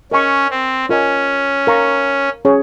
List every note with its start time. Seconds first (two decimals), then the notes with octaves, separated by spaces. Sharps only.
0.12 C#4 A#4 D#5 G#5 C#6
0.50 C4
0.89 C#4 F4 A#4 D#5 G#5
1.67 A#4 F5 A#5 C#6
2.45 C#4 G#4 C#5